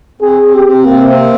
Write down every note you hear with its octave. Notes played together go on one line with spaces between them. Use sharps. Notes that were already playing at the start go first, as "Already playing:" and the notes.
C4 G#4
C4
G4
C4
C3 A#3
C4